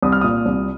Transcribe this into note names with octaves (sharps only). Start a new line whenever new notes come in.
C2 D#6
F6
A#2 D#6
C2